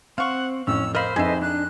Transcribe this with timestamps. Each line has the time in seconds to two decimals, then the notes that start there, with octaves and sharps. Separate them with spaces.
0.18 C4 F5 F#5 C#6
0.67 A1 F2 C#4 E6
0.95 A#4 C5 D#5 F5 B5
1.16 F2 D#4 G#4 A4 B4 D#5 E5
1.42 D4 F#6